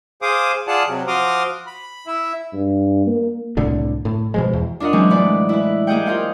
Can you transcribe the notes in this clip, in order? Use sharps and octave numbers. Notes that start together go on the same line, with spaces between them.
G#4 C5 F5 D6 D#6
F4 G#4 D5 F#5 A5
C3 F#3
F3 F#4 C6 D6 D#6 F6
B5
E4 E5
G2
A#3
C2 A2 D3 D4
A2
B2 F3 G#3
E2
D4 F4 A#4 D#5 F#5
D3 E3 F#3 G#3 C4 C#4
A2 G#3 B3 B4 D5
E4 B4
A#3 G4 G#4 D#5 F#5 G5
F4 A#4 C5 F5 F#5